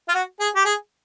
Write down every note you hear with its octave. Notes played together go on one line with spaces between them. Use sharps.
F4
F#4
G#4
G4
G#4